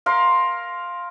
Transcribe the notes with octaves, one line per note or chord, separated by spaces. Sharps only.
A#4 F5 C6